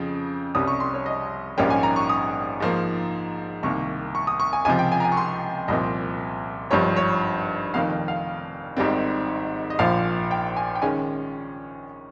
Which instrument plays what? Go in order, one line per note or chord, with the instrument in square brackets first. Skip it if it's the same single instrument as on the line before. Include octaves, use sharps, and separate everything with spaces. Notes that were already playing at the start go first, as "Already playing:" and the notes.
Already playing: [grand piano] F2 C#3 F3
C2 C3 G3 C#4 D#6
C#6
C6
C#5
D#5
A#1 G#2 G3 A#3 C#4 G5
G#5
A#5
C#6
D#6
G#2 F3 A#3
C2 C3 D#3 A#3 C#6
C#6
D#6
C#6
G#5
C#2 C3 F3 G#5
G5
G#5
A#5
G#5
C#6
C6
C2 A#2 F3 C4 D#5
G#1 G2 F3 C#5
C#5
F1 F2 D#3 F5
F5
G#1 G#2 D#3 G3 C4
D#5
A#1 A#2 F3 F5
G5
G#5
G5
D#3 G#3 C#4 G#5